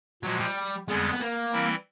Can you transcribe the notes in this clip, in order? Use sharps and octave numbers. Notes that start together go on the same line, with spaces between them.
A#2 F3 F#3 G#3
G3
F2 D3 G3 G#3 B3
B3
A#3
E3 G3 C4 E4